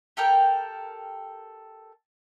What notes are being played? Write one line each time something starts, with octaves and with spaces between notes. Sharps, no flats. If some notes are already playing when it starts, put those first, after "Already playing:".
G4 A4 A#4 G5